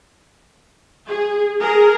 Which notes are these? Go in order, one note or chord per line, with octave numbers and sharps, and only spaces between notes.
G#4
G#4 A#4